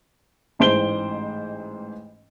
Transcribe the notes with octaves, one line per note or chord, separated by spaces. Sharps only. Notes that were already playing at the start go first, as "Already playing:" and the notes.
A1 G#2 E3 C5 D7 G7